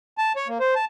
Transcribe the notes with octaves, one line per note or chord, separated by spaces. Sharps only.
A5
C#5
A#3
C5
A5